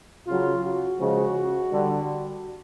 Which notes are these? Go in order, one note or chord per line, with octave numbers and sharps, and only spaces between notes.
C#3 F#3 F4
F#4
C#3 F3 G#3
D3 G3